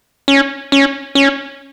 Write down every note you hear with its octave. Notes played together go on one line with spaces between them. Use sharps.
C#4
C#4
C#4